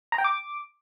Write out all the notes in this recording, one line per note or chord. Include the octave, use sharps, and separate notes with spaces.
A#5
G5
D6